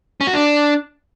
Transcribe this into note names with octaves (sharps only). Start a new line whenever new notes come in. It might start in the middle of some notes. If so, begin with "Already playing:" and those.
C#4
F#4
D4